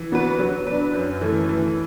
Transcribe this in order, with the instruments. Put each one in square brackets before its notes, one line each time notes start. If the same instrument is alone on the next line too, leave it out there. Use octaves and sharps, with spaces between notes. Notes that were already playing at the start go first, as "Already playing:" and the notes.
Already playing: [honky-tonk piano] E3
B3 F#4 B4
F#3
D4 B4
F#2
E3 A3
E3